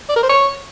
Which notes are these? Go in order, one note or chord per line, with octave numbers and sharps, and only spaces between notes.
D5
A#4
C5
C#5